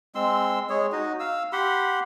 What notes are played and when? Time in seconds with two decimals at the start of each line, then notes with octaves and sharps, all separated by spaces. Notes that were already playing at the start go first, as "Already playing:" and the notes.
0.15 G#3 C4 C6 E6
0.69 G#3 G#4 C#5
0.92 D#4 F#4 D#5
1.20 F5 E6
1.53 G4 F#5 B5 C6